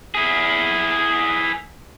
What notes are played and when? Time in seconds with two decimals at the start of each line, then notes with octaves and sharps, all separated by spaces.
0.15 E4 G#4